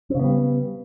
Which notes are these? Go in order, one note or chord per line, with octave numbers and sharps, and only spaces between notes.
C#3 G3 B3 C4